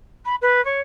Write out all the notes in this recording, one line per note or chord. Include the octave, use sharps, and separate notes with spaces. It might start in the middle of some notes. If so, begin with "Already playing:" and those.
B5
B4
C#5